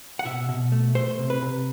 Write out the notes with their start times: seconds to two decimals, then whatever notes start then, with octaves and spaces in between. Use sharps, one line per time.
0.19 F#5
0.25 B2 E5
0.49 B2
0.72 A3
0.95 A3 C5
1.18 C3
1.30 B4
1.42 C3